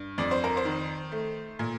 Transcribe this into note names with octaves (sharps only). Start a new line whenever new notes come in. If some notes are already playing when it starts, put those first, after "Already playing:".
Already playing: G2
F2 D5
C5
A#4
C5
D#3
A3
A#2